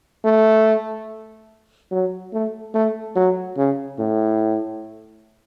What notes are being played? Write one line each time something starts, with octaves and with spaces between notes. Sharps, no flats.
A3
F#3
A3
A3
F#3
C#3
A2